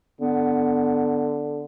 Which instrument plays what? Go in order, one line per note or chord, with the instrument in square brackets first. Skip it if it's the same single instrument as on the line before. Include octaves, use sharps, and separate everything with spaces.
[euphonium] D3 [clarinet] B3